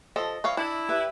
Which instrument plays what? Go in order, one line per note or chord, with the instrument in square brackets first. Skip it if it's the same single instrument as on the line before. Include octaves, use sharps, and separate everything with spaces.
[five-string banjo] F3 A4 [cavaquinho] D#5
[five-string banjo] E3 C#5 F5
[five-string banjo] D4 [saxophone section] E4
[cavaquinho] G4 B4 E5